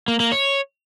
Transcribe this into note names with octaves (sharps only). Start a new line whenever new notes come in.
A#3
A#3
C#5